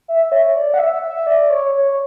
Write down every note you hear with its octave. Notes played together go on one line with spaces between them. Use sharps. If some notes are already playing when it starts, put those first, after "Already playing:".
E5
C#5
D5
F#5
E5
E5
D5
C#5
C#5